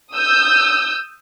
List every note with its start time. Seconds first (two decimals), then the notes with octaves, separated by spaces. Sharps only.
0.14 D#6 E6 G6